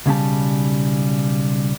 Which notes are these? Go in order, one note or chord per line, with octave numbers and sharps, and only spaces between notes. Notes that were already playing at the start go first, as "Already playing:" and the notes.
B1 C#3 G3 A5